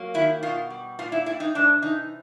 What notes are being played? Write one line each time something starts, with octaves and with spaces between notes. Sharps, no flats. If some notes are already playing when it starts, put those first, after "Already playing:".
Already playing: F#3 A#3
D#3 E4
B2 F4
G3
A#2 F4
E4
G3 E4
D#4
C3 D4
E3 D#4